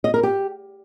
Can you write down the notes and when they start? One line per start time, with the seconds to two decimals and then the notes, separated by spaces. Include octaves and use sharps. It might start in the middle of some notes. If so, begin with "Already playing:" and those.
0.04 D#5
0.14 A#4
0.23 G4